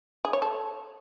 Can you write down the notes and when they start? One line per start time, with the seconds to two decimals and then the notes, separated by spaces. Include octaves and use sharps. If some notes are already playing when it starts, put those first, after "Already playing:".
0.25 G#4
0.33 C#5
0.42 A4